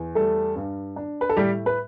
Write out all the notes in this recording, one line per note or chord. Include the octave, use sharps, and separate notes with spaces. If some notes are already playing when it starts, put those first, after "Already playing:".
Already playing: E2
G3 A3 A4
G2
D4
B4
A4
A2 G3 G4
B4